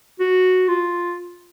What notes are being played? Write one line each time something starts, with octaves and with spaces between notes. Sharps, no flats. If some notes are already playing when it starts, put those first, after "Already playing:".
F#4
F4